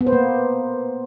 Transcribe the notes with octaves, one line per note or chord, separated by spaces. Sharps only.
B3
C5
A#3